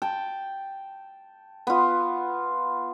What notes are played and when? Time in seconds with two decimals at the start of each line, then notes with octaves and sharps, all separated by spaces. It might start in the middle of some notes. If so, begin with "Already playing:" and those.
0.02 G5 A5
1.67 B3 F4